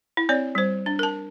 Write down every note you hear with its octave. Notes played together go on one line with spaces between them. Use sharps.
E4
C4 C#5 D5
G3 C5
D4
A#4 A5